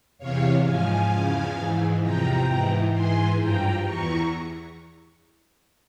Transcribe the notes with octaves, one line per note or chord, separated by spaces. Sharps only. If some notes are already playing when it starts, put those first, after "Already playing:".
E2 C3 E3 C#5 F5
G#2 F3 F5 G#5
E2 C#3 F3
G#2 E3
E2 C3 F3 G5 A#5
G#2 E3
G#2 E3 G#5 C6
G2 F3 G5 A#5
E2 E3 A#5 C#6